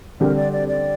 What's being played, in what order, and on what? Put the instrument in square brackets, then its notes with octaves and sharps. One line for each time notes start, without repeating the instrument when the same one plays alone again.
[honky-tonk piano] D3 G3 C4 G4 [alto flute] A#4
[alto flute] D5
D5
D5